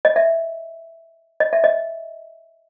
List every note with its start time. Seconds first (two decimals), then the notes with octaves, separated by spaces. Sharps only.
0.05 D#5
0.16 E5
1.40 D#5
1.53 E5
1.64 D#5